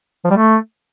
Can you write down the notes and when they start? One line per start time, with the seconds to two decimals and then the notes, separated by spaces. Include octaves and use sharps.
0.24 F3
0.31 G3
0.37 A3